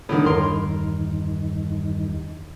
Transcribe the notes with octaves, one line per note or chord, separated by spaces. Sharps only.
A2 D3 D#3
E2 G2 D#3 A#4 C6